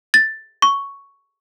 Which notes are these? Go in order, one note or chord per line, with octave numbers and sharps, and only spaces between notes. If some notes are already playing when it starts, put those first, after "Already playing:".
A6
C#6